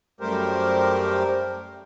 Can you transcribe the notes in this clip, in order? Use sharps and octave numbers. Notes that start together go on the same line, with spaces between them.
F#2 G3 A3 G4 A#4 C5